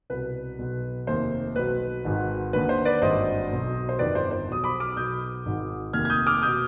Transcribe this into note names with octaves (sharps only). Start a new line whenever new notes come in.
C2 B2 B4
B1 B2
F1 D#2 D#3 C5
B1 B2 B4
G#1 G#2 D#3
D#2 D3 B4
C5
B4 D5
G#1 G2 D#3 C5 D#5
B1 B2
C5
G1 F2 D#3 B4 D5
C5
C5
B1 B2 D#6
B5 D6
D6 F6
B1 B2 D#6 G6
G#1 G#2 D#3
F1 D#2 D#3 F6 G#6
G#6
D#6 G6
D6 F6
B2 D#6 G6